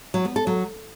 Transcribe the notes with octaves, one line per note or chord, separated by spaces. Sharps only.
F#3
B3
A4
F#3